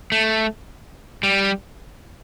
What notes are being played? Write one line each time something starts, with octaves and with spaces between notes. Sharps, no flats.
A3
G3